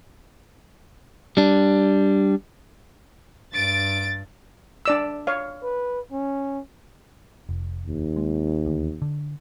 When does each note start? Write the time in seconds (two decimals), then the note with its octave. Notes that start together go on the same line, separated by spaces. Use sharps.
1.37 G3 D4
3.53 G2 A6 D7
4.85 D4 D5 E6
5.27 C#5 F5
5.63 B4
6.12 C#4
7.49 F1
7.86 D#2
8.16 G#3
8.66 D2
9.02 D3